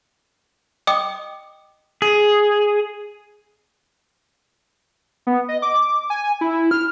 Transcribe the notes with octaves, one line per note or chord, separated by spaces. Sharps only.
D#5 G5 D6 D#6
G#4
B3
D#5
D6
G#5
E4
F6